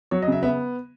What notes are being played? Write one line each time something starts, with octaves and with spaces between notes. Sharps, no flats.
F#3 C#5
D#5
C#3 E5
B3 E5